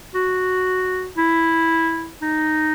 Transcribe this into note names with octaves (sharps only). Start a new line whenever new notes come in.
F#4
E4
D#4